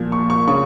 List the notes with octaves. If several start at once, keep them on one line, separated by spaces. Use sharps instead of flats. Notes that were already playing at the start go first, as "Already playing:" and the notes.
Already playing: A#2 F3
C#6
C#6
C#3 C#6